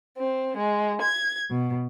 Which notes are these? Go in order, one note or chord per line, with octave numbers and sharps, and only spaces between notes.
C4
G#3
G#6
B2